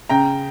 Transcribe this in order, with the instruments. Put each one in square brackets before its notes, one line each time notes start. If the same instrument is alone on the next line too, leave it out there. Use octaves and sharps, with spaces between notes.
[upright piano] C#3 G5 A#5